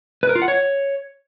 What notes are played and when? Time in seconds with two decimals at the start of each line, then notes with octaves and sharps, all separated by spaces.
0.23 B4
0.29 A#4
0.35 F4
0.42 F#5
0.48 C#5